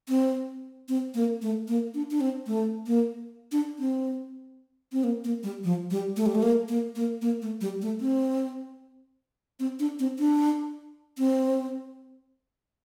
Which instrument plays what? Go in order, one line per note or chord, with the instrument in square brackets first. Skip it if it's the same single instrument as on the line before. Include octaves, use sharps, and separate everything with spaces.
[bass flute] C4
C4
A#3
A3
A#3
D4
D4
C4
A3
A#3
D4
C4
C4
A#3
A#3
G3
F3
G3
A3
G3
A3
A#3
A#3
A#3
A#3
A3
G3
A3
C4
C4
D4
C4
D4
C4